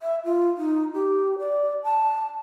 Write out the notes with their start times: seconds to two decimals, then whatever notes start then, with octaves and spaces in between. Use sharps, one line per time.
0.01 E5
0.25 F4
0.58 D#4
0.94 G4
1.39 D5
1.84 A5